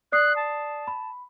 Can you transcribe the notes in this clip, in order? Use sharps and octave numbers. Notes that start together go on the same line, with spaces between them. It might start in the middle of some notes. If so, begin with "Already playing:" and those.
D5 D#6 F#6 C7
A5
B5